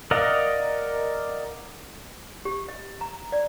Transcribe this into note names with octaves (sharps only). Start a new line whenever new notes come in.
A#4 D5 D#5 F5 F#5
G4
D#5
A#5
D5